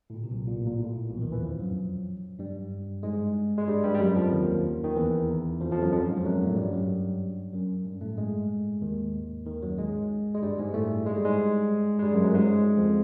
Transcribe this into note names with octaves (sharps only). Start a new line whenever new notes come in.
A2
A#2
C3
B1 B2
A#2
A2
A#2
A2
A#2
B1 B2
E3
D#2 D#3
E2 E3
F2 F3
F#2 F#3
G2 G3
G#2 G#3
G#3
G2 G3
G2 G3
G3
F#2 F#3
F2 F3
D#2 D#3
D#3
E2 E3
F2 F3
F2 F3
F#2 F#3
F2 F3
F#2 F#3
G#2 G#3
F2 F3
F#2 F#3
G2 G3
A2 A3
G2 G3
F#2 F#3
F#2 F#3
G2 G3
A2 A3
G#2 G#3
D#2 D#3
D#2 D#3
F#2 F#3
G#2 G#3
G#3
G2 G3
G#2 G#3
A2 A3
G#3
G3
G#2 G#3
G#3
G2 G3
F#2 F#3
F#2 F#3
A3
G#2 G#3
F2 F3